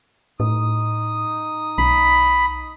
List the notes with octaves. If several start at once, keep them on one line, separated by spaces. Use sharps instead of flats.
A2 D#4 D#6
B1 B5